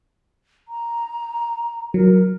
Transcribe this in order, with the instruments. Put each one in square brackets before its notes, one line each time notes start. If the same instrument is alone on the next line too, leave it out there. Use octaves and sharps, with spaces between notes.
[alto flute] A#5
[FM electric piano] F#3 [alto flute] A#4